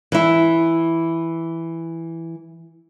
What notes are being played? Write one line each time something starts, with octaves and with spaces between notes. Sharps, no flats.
E3 E4